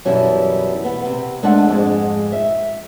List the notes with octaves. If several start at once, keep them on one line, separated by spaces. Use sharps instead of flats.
F#2 B2 E3 G3 E4
B3
C3
G#3 A3 D4 D5 F#5
F2 G#2 G#3
E5